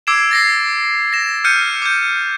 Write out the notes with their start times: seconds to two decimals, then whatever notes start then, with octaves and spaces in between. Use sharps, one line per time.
0.07 D6 E6 G#6 C7 D7 E7
0.31 A6 A#6 C7
1.13 A#6 E7
1.44 F6 G6 C#7 D#7
1.82 D6 G6